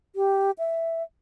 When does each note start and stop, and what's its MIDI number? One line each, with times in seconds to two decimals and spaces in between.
0.16 0.51 67
0.58 1.02 76